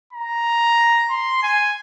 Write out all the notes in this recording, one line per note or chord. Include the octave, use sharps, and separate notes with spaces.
A#5
C6
G#5